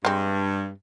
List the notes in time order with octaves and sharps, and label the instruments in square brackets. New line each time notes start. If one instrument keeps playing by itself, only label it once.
[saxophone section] G2 [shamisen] G#3 C4